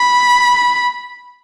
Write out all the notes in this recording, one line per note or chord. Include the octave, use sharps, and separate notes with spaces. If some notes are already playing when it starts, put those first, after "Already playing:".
Already playing: B5